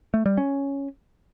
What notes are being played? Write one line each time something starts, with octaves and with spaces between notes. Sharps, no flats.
A3
G3
C#4